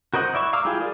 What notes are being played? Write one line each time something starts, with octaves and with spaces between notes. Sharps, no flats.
F#4 A#4 C5 D#5 F#5
E4 D5 E5 C#6
F5 A#5 D6 E6 F6
E4 F4 G4 G#4 F5
G4 G#4 A#4 D5